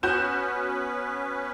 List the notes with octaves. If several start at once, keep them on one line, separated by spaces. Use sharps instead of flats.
B3 C#4 F#4 B4 G6 E7